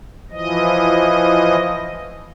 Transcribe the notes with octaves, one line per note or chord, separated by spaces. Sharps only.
E3 F3 D#5